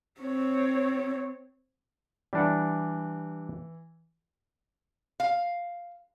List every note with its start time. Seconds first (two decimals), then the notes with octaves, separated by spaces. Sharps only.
0.21 C4 C#5
2.33 E3 G3 D4 F#5
5.20 F5